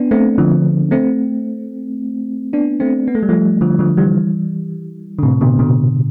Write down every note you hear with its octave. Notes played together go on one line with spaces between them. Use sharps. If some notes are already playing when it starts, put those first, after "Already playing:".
Already playing: B3 D4
A3 C4
D3 F3
A3 C4
B3 D4
A3 C4
B3
A3
G3
F3 A3
D3 F3
D3 F3
E3 G3
D3
A2 C3
B2 D3
B2 D3